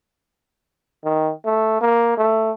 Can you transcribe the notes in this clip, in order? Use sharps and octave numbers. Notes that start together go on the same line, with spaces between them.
D#3
A3
A#3
A3